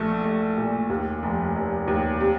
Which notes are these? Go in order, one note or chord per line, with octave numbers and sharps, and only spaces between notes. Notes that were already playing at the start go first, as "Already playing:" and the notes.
Already playing: A#1 A3
A3
A#2
D#2
F1
F1
D#2
C3